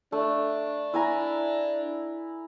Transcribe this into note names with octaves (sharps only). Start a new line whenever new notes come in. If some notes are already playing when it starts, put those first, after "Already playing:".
A3 D4
E4 G#5 A#5